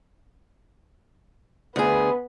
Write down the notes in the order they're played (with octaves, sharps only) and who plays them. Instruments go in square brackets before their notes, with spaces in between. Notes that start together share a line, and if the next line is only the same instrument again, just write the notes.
[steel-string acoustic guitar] D2 G#4 [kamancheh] B3 B4